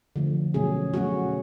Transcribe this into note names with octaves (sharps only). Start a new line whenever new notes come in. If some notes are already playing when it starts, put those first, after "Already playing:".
D3 F3 A3
B2 F#3 A3 C#4 G#4
B2 F#3 A3 C#4 F#4